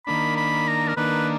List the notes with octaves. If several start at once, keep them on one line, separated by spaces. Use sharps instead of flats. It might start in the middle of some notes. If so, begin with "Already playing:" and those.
D#3 A#3 D4 B5
B5
A#5
A#4
D#3 A#3 D4 B4